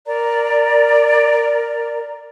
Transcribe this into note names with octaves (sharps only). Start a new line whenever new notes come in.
A#4 D5 A#5